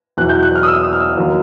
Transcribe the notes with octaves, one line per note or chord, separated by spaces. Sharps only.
E2 B2 F#3 F#6
G6
F#6
F6
D#6
E6
D#6
F6
E6
D#2 D#3 F#3